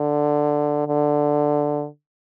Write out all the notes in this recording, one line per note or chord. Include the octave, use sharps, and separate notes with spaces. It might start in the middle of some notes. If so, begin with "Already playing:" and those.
Already playing: D3
D3